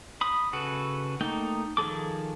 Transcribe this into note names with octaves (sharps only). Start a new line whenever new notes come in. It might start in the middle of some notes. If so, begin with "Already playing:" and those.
B5 D#6
C#3 F#4 A4 B4
A3 A#3 D#4 G5
D#3 F3 G#4 A4 D6